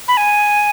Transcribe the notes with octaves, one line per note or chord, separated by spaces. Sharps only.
B5
G#5